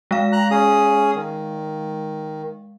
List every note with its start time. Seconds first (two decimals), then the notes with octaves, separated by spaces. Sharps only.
0.11 G#3 F5
0.32 A#5 F#6
0.51 C#4 G#4 D#6
1.15 D#3